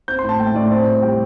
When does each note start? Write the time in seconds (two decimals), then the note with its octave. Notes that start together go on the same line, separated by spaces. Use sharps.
0.08 C4 G6
0.19 A2 C6
0.29 A5
0.39 A3 G5
0.55 A2 D5
0.72 C4
0.87 C3
1.02 G3 G5